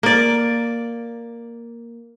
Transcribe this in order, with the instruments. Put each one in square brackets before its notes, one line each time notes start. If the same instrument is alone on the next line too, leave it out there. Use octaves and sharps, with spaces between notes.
[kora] A#3 D5